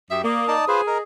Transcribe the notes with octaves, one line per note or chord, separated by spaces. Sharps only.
F#2 G4 E5 D#6
A#3 D5 D#6
D#4 D5 A5
F4 G#4 B4 C5
A#4 D#5